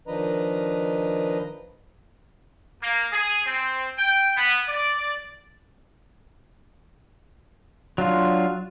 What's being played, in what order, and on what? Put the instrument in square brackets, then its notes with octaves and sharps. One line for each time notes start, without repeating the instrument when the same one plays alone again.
[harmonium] D#3 F3 D4 B4 D#5 A#5
[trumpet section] A#3
G#4
C4
G5
B3
D5
[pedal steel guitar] F#3 D4 F4